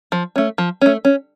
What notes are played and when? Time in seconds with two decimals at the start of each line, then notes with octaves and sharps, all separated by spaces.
0.12 F3
0.36 A3 C#4
0.58 F3
0.82 A3 C#4
1.05 C#4